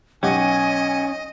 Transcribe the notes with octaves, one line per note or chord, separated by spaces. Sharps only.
B1 C#4 G4 D#5 F#5 G#5